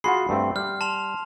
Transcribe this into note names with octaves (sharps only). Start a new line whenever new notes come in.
F4 F#4 G#4 F#5 B5 C6 C7
G2 A3 C4
G3 F6
A5 C6 F7